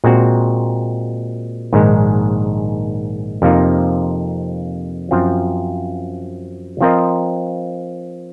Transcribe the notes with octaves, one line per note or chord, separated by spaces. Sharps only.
A#2 G#3 C4 F#4
A#1 G#2 D#3 G#3
F2 C3 F3 A#3 D#4
F#2 F3 C4 F4
F3 C4 F4 A#4 D#5